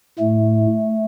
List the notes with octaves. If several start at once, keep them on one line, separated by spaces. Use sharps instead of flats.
A2 A3